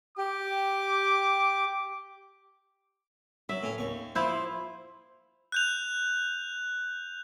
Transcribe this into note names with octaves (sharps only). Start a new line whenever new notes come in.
G4 D6
F#3 E5
A2 C#4
D#2 C#6
F3 E4 C5
F#6 G6 F7